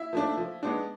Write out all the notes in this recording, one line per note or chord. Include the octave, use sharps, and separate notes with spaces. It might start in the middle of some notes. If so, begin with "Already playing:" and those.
Already playing: E4 E5
F3 A3 D4
F3
G#3 B3 D4